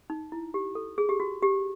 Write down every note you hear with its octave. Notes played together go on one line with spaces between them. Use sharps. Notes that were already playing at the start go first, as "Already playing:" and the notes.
D#4
E4
G4
A4
G#4
G4
F#4
G4